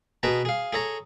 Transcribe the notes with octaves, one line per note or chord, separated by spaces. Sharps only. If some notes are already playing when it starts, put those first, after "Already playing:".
B2 G#4 B4 A5 A#5
G#4 F5
G#4 A4 C#5 A#5